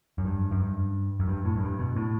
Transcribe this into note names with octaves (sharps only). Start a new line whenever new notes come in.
F#2
G2
F#2
G2
F#2
G2
A2
F#2
G2
B2
A2